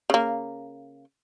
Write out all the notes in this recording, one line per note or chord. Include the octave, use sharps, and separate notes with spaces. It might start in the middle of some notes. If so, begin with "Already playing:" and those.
C#3 A#3